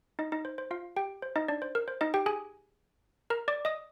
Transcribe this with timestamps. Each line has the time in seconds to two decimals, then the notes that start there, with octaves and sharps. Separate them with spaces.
0.19 D#4 D#5
0.32 D#4 D#5
0.45 C5
0.58 C5
0.71 F4 F5
0.96 G4 G5
1.22 C5
1.36 D#4 D#5
1.48 D4 D5
1.62 C5
1.75 A#4
1.88 C5
2.01 D#4 D#5
2.14 G4 G5
2.26 G#4 G#5
3.30 A#4 A#5
3.48 D5 D6
3.65 D#5 D#6